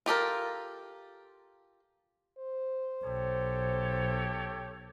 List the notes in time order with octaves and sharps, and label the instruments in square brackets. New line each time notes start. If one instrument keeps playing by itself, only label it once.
[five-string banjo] F4 G4 A4 A#4
[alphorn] C5
[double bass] B1 [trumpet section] G4 A4 C#5